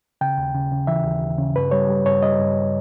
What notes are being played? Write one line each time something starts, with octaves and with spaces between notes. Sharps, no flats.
C#3 G5
D#2
C#3
C#3
E3 E5
D#2
D#2
C#3
G2 B4
G3 C#5
G3
G2 C#5
G3 D#5
G2